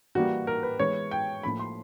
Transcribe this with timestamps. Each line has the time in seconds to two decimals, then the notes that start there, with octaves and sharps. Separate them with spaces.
0.15 E3 G3 A#3 F#4
0.47 A#4
0.63 B4
0.79 E3 G#3 B3 C#5
1.11 G5
1.43 A2 F3 A#3 B5
1.59 C6